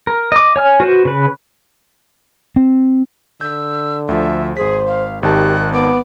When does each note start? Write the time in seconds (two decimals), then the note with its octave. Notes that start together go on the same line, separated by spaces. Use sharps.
0.07 A#4
0.32 D#5 D6
0.56 C#5 G#5 F6
0.80 F#4 B4 C5
1.05 C#3 B4
2.56 C4
3.41 D3 E6 G6
4.09 D2 F3 E5
4.57 G#1 G#4 C5 B6
4.87 F5
5.23 G#1 D#3 G4 A5 F#6
5.74 B3 D6